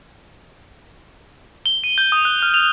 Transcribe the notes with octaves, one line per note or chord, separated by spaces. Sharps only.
G7
D#7
G6
D#6
F#6
F6
F7